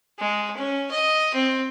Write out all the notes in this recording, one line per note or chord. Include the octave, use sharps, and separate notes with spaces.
G#3
C#4
D#5
C4